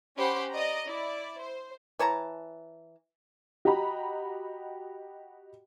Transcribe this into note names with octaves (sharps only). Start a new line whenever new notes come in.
C#4 G4 C5 F#5 B5
D5 D#5 A#5
E4 D5
C5
E3 C#5 A5 A#5
F#4 G4 D#5 A#5 B5